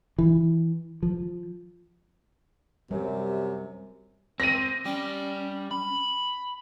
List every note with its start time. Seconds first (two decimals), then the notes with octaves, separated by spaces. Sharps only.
0.18 E3
1.03 F3
2.91 F#2 C3 G3
4.40 C4 A#6 D#7
4.85 G3 C#4 G4
5.71 B5